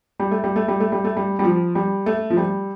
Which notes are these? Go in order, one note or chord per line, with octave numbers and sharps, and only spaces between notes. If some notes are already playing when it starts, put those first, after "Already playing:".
G3
A3
G3
A3
G3
A3
G3
A3
G3
G3
F3
G3
A3
F3
G3